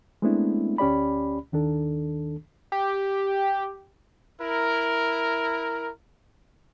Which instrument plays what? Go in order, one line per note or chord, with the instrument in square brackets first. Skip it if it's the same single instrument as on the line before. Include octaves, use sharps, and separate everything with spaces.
[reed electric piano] G#3 A3 B3 C4 D4 E4
D2 C#4 G4 D5 B5
D#2 D#3 D4 A4
[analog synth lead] G4
[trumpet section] E4 A#4